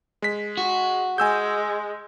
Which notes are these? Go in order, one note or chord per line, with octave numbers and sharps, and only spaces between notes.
G#3 B6
F#4
G#3 G#5 E6 G6